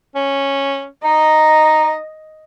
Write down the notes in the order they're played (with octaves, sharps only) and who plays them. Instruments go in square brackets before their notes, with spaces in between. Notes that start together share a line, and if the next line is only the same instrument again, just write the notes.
[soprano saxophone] C#4
[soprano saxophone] D#4 [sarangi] D#5 [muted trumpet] A#5